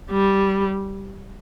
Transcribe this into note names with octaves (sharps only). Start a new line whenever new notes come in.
G3